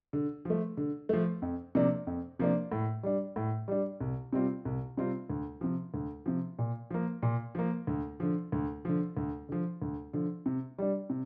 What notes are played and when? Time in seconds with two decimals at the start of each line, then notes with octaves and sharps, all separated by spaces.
0.13 D3
0.45 F3 A3
0.77 D3
1.09 F3 A3
1.42 F2
1.75 C3 F3 A#3 D4
2.07 F2
2.39 C3 F3 A#3 D4
2.72 A2
3.03 G3 D4
3.36 A2
3.68 G3 D4
4.01 C2
4.33 C3 G3 C4 F4
4.65 C2
4.97 C3 G3 C4 F4
5.30 D2
5.61 C3 F3
5.94 D2
6.26 C3 F3
6.59 A#2
6.91 F3 A#3
7.23 A#2
7.55 F3 A#3
7.87 D2
8.20 D3 F3
8.52 D2
8.85 D3 F3
9.17 D2
9.49 D3 F3
9.82 D2
10.13 D3 F3
10.46 C3
10.78 G3 D4
11.10 C3